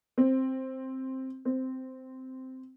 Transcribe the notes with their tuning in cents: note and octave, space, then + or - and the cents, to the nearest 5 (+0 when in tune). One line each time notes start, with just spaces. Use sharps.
C4 +5
C4 -10